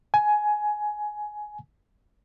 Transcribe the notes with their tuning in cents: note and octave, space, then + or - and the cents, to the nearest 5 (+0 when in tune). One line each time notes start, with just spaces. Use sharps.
G#5 +15